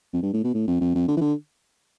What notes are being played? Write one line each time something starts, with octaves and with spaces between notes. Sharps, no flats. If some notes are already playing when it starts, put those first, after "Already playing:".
F2
G2
A2
B2
A2
F2
F2
F2
D3
E3
D3